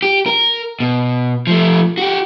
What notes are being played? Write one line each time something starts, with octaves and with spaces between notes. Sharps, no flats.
G4
A#4
B2
F3 A3
F#4 G4